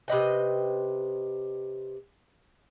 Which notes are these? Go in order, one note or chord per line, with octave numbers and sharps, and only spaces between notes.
C3 B4 D#5 G5